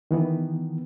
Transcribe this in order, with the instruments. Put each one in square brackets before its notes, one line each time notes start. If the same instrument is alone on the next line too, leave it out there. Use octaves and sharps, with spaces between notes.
[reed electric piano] D#3 E3 B3